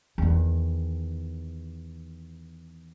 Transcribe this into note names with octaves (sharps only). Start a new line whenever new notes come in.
E2 D#3